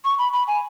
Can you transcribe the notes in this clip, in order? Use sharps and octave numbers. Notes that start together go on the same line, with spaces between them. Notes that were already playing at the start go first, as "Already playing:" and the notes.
C#6
B5
B5
G#5